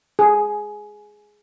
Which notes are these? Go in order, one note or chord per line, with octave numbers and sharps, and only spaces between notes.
G#4